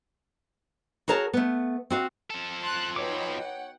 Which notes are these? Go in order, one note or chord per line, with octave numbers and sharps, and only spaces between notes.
F#4 G#4 A#4 C#5 A5
A3 B3
C4 F#4 F5
F3 A4
A5 C6 F#6
B2 D#4 C#5 G5 B5 D6
F#5